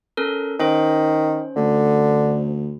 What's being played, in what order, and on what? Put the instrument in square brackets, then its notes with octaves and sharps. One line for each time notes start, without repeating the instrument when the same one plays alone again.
[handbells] C#4 A4 A#4
[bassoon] D#3 [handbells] C#4 C5
[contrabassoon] D2 [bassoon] D3